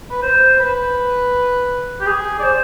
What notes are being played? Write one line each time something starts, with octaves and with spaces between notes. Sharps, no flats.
B4
C5
B4
G4
G#4
D5
C5